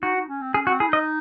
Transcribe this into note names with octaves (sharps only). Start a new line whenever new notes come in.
D#4 F#4
D#4
C#4
C4
C#4 G#4
F#4
C4
E4 G#4
D#4 D#5